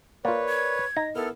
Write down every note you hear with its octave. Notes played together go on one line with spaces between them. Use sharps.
A#3 F4 A#4 B4 C#5 D5
G#6
D#4 A#6
B3 E4 A4 A#4 F6